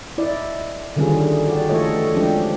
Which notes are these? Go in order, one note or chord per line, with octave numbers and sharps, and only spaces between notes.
E4 D5 D#5
D3 D#3 G3 C#4 F4 G#4
F#4 G4 D5
E3 A3 F4 A4 C#5 D#5
F3 G#3 C#4 D4 G4